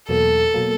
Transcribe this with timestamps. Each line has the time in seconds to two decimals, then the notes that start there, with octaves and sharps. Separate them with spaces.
0.09 E2 B2 F#3 A#3 A4
0.54 B2 F#3 A#3